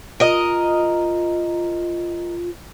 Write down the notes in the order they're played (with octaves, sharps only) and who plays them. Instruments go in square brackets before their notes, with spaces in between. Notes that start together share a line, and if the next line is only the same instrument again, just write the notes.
[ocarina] F4 [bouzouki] A#4 D#5